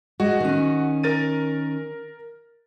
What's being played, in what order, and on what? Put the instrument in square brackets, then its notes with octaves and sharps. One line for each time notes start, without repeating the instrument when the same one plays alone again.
[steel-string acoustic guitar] G#3 [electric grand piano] F#4
[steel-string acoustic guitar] D#3 C#4
[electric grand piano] A#4 A6 D#7